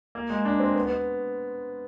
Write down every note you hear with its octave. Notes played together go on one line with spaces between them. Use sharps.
A#3
G#3
D4
C4
B3
B3